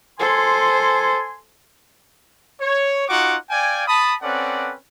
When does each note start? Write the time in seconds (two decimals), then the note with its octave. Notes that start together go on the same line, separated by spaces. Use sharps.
0.20 A4 C5 G#5 C6
2.61 C#5
3.08 D#4 F4 F#4 F#5 C#6 D6
3.50 D5 F5 G5 G#5
3.87 A5 B5 D#6
4.22 C4 C#4 A4 B4 D5 F#5